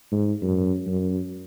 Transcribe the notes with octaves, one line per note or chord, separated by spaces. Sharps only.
G#2
F#2
F#2